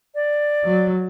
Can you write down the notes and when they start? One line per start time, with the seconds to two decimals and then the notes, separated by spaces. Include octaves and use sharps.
0.15 D5
0.65 F#3